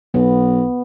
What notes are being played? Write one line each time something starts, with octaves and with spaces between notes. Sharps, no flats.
B1 B3